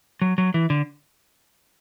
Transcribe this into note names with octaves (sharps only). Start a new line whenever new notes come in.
F#3
F#3
E3
D3